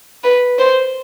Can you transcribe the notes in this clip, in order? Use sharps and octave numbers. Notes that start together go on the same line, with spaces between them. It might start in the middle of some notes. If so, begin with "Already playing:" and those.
B4
C5